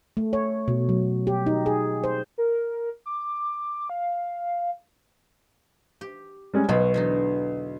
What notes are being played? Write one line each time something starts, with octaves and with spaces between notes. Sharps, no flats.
A3
C#5
B2
F#3
G4
D#4
G#4
C5
A#4
D6
F5
G4
G3 G#3 C#4
B1 B2 F#4 B5
E2 D3 D#4